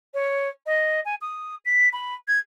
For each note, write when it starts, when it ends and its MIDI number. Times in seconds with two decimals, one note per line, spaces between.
0.14 0.48 73
0.66 1.00 75
1.05 1.15 80
1.21 1.55 87
1.65 1.89 95
1.93 2.14 83
2.27 2.39 92